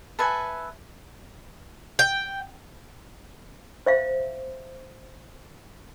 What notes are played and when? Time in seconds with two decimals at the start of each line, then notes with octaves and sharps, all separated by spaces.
0.19 A4 B4 E5 G#5
1.99 G5
3.86 C5 E5 F5